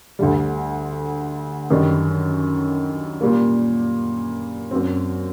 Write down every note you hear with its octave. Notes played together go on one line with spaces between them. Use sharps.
D2 D3 G3
F#2 D#3 G3 D4
A#2 G3 A#3
F#2 F#3 C4